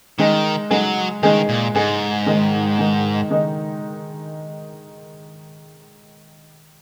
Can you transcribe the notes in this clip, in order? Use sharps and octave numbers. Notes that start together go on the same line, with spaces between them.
D#3 G#3 D#4 G#4
F#3 G#3 D#4 G#4
D#3 G#3 D#4 G#4
A#2
G#2 G#3 D#4 G#4
D#3 G#3 D#4
D#3 G#3 D#4
D#3 G#3 D#4